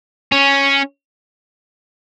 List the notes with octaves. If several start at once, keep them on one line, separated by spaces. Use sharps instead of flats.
C#4